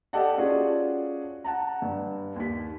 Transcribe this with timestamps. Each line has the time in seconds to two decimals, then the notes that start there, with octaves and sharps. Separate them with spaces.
0.13 G4 A4 D5 D#5 F#5 A5
0.38 C#4 F4 F#4 G#4 D5
1.44 F#5 A5 A#5
1.82 G2
2.36 D#2 B6